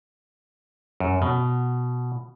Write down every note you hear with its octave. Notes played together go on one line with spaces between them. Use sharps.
F#2
B2